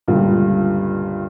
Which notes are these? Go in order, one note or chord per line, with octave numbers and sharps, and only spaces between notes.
C#2 G2 A#2 D3 G3